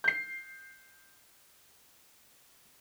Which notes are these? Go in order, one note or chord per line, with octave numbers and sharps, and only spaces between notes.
G6 C7